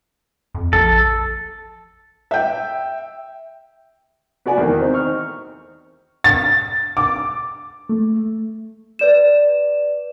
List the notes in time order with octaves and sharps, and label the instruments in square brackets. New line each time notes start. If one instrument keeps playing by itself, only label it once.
[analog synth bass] F2
[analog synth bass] A#1 [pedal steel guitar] A4
[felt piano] E5 G5
[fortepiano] B3 F#4 D5 G#5
E2 D#3
C4 D#4
C#6 F6
[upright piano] A6
D6
[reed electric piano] A3
[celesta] B4 D5 E7